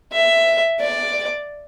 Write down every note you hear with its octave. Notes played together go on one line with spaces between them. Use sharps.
E5
D5